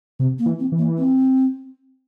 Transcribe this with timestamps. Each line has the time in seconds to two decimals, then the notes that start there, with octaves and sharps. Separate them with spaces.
0.20 C3 C4
0.39 A#3
0.46 E3
0.59 C4
0.72 E3
0.78 A#3
0.98 C4